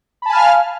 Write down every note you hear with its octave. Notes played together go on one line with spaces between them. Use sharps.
F5 G#5 A5 B5 F6